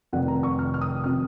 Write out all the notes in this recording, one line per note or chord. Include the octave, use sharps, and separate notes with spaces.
F1 F2 D#3 F#5
A#5
C#6
F6
F6
D#6
C3 D#3 F6